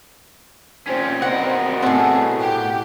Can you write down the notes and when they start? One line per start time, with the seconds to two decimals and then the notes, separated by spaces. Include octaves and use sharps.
0.87 A#2 C4 C#4
1.22 B2 A#4 F#5
1.82 A2 C4 G#4 E5 F#5 A5
2.40 G4 F#5